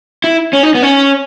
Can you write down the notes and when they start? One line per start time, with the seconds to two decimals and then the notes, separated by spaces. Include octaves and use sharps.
0.24 E4
0.53 C#4
0.63 D#4
0.75 B3
0.82 C#4